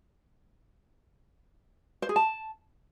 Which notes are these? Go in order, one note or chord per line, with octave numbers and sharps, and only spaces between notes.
C5
G#4
A5